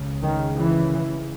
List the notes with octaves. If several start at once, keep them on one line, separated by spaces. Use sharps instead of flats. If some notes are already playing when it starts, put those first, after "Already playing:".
Already playing: C#2 C#3
D#3
E3